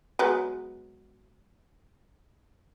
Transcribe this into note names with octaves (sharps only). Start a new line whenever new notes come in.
F#3 G#3 B3